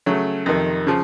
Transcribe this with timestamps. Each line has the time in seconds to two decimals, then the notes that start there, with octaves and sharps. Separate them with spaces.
0.06 C#3 F#3 A3
0.46 F2 C3 D#3
0.87 C#3 F3